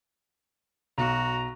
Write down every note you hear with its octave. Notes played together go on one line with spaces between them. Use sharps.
B1 F#4 A#5